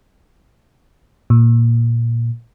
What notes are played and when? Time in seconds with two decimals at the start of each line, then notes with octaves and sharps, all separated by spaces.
1.30 A#2